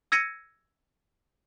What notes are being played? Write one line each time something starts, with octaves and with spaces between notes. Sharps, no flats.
E6 G#6 A#6 C#7 D#7